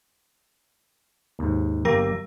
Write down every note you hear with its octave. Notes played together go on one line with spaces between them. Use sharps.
D#2 G#2
G1 F#3 A#3 G4 A#4 A#6